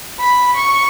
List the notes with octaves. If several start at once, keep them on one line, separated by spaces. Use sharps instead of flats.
B5
C#6